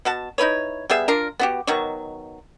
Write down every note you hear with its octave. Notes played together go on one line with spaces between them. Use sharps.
B2 F#4 A5
D#4 E4 B4 C#5
G3 B3 G#4 E5
D4 F4 A#4
B3 F#4 G4
B2 D#3 F#3 C#6